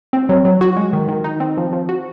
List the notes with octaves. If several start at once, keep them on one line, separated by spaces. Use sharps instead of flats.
C4
F#3
F#3
F#4
G#3
D#3
D#3
D#4
C4
F3
F3
F#4